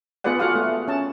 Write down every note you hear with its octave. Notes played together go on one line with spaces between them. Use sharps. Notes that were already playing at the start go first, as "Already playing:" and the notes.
B3 F4 G#4 B4 D5 F#5
F4 F#4 G#4 A4 F5 F#5
A3
C#4 A5